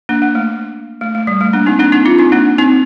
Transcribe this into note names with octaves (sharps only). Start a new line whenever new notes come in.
A#3 D4
A#3
A3
A3
A3
G3
A3
A#3 D4
C4 D#4
A#3 D4
C4 D#4
D4 F4
C4 D#4
A#3 D4
C4 D#4